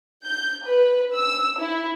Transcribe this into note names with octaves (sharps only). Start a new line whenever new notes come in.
G6
B4
E6
E4